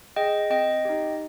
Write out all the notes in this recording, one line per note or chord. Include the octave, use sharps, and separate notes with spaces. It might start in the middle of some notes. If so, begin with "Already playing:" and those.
G#4 D#5 G5
C4 D#5 G5
D#4 G4